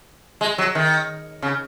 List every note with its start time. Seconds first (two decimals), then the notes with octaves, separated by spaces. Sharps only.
0.41 G#3
0.58 F#3
0.75 D#3
1.42 C#3